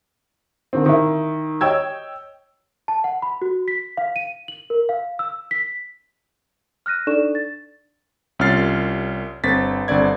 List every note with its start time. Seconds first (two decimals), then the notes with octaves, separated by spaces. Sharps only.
0.73 D3 D#3 C4
0.86 D#3 E4
1.61 C#5 D#5 G5 E6 G#6
2.88 A5
3.04 F#5
3.22 B5
3.42 F#4
3.68 B6
3.97 F5
4.16 D#7
4.48 F#7
4.70 A#4
4.89 F5
5.19 E6
5.51 B6
6.86 F6 F#6 A#6 D#7
7.07 D4 D#4 A4 D5 C#6 E7
7.35 A6
8.39 C2 C#4 F4 F6 A6 C7
9.44 G1 C4 A6 B6
9.88 G1 D3 C4 D5 G#6